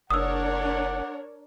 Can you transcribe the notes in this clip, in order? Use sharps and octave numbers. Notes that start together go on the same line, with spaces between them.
F#1 D4 A#4 C#5 D5 F#5 D#6 E6